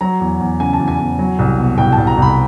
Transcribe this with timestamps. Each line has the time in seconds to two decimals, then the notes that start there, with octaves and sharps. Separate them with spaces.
0.01 F#3 A#5
0.20 E2
0.40 E2
0.60 C#3 G#5
0.73 A5
0.80 E2
0.88 G#5
0.99 E2
1.19 F#3
1.39 C2
1.58 B2
1.78 C2 G5
1.92 C2 A5
2.07 A#5
2.17 C2 B5